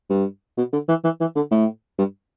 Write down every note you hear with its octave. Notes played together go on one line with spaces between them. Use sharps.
G2
B2
D3
E3
E3
E3
D3
A2
G2